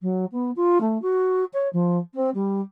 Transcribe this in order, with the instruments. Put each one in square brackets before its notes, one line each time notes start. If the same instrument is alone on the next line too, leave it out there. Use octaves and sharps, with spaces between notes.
[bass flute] F#3
B3
F4
A3
F#4
C#5
F3
C4
G3